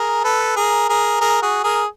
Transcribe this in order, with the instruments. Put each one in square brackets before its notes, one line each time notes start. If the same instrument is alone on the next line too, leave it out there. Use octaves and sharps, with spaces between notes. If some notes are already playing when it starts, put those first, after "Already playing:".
Already playing: [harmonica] G#4 A#4
A4 B4
G#4 A#4
G#4 A#4
G#4 A#4
F#4 G#4
G#4 A#4